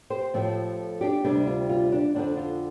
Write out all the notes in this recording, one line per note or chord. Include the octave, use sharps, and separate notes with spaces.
G4 C5
A2 F3 A3 C4
D4 G4
D2 C3 G3 C4 D4
F4
F4
D4
F2 D3 F3 C4 D4
F4